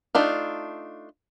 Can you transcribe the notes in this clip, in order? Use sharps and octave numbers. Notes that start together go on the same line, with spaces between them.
A3 D4 D#4 F4